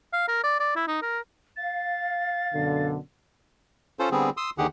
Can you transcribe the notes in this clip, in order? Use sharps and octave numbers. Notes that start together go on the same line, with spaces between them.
F5
A#4
D5
D5
E4
D#4
A#4
F5 A6
F#2 B2 D3
C#4 F4 A4 C5
D3 G3 B3 C4 G#4
C6 D#6 E6
D#2 D3 D#3 G4 G#4 F#5